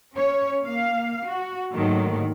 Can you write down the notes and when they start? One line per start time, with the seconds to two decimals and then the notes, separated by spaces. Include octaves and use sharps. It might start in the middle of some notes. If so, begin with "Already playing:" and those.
0.16 C#4 C#5
0.61 A#3 F5
1.25 F#4
1.73 D#2 G#2 D3 D#3 F#3 A3